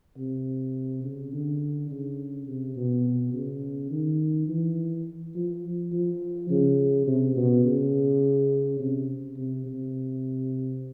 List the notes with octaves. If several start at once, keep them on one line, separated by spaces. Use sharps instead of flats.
C3
C#3
D3
C#3
C3
B2
C#3
D#3
E3
F3
F3
C#3
C3
B2
C#3
C3
C3
C3